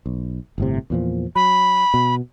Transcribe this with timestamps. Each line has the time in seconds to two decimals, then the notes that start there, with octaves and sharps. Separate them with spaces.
0.06 B1
0.58 G1 A2 C3
0.90 E2 A#2 F3
1.35 F#3 B5
1.94 B2